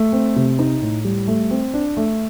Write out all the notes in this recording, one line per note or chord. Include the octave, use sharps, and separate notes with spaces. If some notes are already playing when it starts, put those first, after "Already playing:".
Already playing: A3
C4
C3
D#4
A2
G3
A3
C4
D4
A3